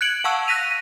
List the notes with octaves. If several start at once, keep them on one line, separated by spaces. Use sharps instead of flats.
F#6 G#6 C#7 D7 F#7
F5 F#5 A5 C#6 E6
F#6 A#6 B6 D#7 F7